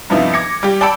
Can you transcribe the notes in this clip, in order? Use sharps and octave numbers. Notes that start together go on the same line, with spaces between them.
G2 C3 F3 B3 D#4 E4
D6 G#6 A#6 C#7
G3 G4
D5 G5 A5 B5 E6 C#7